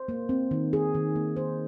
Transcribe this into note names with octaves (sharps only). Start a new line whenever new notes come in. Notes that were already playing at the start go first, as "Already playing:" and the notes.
Already playing: C5
A#3
C4
D#3
G#4
D#3
A#3
C5